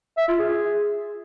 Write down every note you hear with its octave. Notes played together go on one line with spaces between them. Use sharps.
E5
F4
G#4